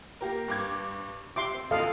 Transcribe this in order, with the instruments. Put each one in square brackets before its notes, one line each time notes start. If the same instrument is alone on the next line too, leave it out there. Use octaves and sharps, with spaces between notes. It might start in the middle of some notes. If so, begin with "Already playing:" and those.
[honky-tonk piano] A#3 G4 A#4
G2 D6 G#6
[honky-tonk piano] G4 E5 [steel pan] C6 D6
[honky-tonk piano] C4
[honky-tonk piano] A1 D2 A#2 [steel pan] A4 D#5 F5